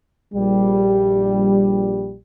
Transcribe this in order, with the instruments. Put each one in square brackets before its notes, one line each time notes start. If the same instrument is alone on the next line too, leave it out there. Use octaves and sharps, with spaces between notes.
[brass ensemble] A#1 G3